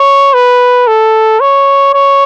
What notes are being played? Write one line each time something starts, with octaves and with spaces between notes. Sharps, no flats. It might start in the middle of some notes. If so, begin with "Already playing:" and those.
Already playing: C#5
B4
A4
C#5
C#5